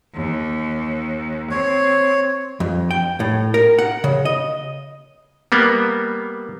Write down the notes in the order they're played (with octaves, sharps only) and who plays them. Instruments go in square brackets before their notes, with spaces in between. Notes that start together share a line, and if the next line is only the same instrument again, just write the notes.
[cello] D#2
[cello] C4 [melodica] C#5
[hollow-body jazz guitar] F2
G5
A2
A#4
F#5
C#3
D#5
[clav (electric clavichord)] G3 A#3 B3